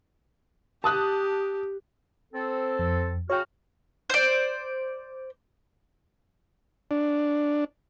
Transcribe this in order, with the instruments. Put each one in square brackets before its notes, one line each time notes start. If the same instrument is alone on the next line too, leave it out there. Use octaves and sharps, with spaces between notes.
[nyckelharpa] G4 [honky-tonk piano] A5 D#6 F#6
[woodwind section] C4 A4
[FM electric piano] F2
[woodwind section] C#3 F#4 F6 [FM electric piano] C#5 G5
[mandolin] C5 D5
[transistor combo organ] D4